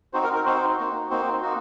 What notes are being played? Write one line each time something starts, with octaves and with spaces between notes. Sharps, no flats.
C4 D#4 F#4 C5
A#4
A#4
C4 D#4 F#4 C5
A#3 D#4 F#4
A#3 C4 D#4 F#4 C5
A#3 D#4 F#4